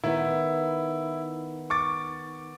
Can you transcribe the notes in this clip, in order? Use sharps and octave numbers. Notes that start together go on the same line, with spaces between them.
D#3 B3 E4
C#6 D6 A6